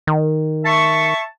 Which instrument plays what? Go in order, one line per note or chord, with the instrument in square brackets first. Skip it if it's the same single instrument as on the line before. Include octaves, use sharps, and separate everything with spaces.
[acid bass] D#3
[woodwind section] E5 A5 C#6